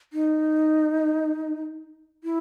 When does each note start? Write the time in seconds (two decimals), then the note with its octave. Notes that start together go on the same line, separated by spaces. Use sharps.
0.13 D#4
2.24 E4